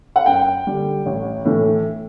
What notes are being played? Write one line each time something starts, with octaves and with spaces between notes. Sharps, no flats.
F#5
F#2 G5
D3 G3
A1
A2 E3 A3